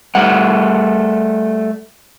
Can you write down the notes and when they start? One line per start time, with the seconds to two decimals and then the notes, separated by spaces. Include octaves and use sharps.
0.15 G3 A3 F#5